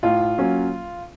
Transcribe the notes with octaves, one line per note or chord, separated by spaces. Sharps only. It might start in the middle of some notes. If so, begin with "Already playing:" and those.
A2 F4
F#3 A#3 C#4